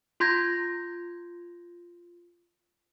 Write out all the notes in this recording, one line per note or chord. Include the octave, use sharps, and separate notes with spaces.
F4 C6 G6 G#6 A#6